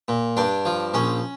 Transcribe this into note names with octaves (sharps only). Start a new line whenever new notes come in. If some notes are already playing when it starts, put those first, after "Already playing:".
A#2
G2 D4
F3
A#1 C#4